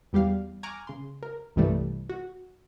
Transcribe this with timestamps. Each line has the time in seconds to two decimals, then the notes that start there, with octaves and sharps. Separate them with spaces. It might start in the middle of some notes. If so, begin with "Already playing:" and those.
0.13 E2 G3 G4 F5
0.63 G#5 A#5 C#6 D6 F6 F#6
0.87 C#3 C6
1.23 A#4
1.56 C2 G2 C3 E3 G3 A3
2.09 F#4